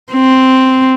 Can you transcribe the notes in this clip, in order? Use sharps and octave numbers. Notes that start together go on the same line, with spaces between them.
C4